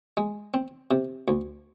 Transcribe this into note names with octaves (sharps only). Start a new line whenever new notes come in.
G#3
C4
C3
D2